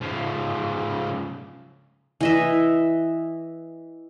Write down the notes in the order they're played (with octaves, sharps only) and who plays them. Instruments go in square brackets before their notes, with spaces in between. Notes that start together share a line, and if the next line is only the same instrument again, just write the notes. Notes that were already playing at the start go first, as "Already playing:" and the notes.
[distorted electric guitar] C#3 F3
[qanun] E3 D#5 E5